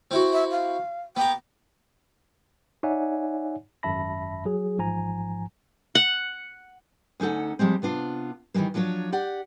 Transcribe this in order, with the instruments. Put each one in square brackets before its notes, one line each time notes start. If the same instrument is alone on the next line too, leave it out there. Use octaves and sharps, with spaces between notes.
[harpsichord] C4 E4 F#4
[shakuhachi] E5
F5
[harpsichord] B3 A#5 [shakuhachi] G5
[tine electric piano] D#4 C#5 D5 E5 F#5 G#5
G#1 F#2 E5 A5 B5 A#6
F#3 G#4
A1 G#2 F3 G#5 A#5
[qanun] F#5
[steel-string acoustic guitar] D2 C#4 D#4 A4 F#5
F3 G3 G#3 C4
C3 B3 D4 F4
D#3 E3 G3 G#3 A#3
F3 F#3 D4 F4 C#5
G4 D5 F#5